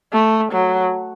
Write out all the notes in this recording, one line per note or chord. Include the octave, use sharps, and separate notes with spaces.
A3
F#3